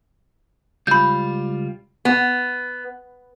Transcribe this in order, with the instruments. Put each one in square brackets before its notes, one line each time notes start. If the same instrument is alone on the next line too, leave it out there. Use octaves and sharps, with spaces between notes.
[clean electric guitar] C#2 G3 F4 [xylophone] B5 G6
[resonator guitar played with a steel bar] B3